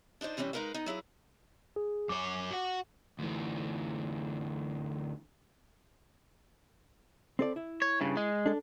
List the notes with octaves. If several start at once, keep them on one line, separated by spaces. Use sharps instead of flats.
D4 D#4 F4 C5 D5
C3 E3 G3 C4 C#4
G#3 D#4 A#4 B4 F5
B3 D#4
F#3 E4 G#4 F5
G#4
F#2 C#5 D6
F#4 F#5
D2 E3
C4 A4 D5
E4
C#5
G2 C#3
G#3
D4 A4